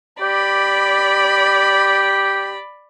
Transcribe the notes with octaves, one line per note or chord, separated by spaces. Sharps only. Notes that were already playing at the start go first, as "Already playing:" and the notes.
G4 D5 B5